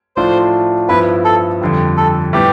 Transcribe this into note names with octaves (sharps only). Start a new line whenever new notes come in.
A2 F3 A3 D4 F4 C5
G2 F3 B3 E4 B4
A4
F2 D3 G3
A4
A2 G3 B3 G4